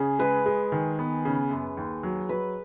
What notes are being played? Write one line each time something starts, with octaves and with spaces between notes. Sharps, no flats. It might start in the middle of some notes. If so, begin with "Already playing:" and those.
Already playing: C#3 G#4
G#3 B4
G#3
D#3
B3
C#3
F#2
D#2
F#3
F#3 B4